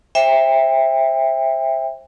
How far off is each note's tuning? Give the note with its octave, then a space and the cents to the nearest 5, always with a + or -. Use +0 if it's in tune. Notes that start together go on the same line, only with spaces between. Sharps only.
C5 +35 E5 +0 G5 +30